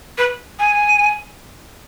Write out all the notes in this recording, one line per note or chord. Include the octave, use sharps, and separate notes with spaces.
B4
G#5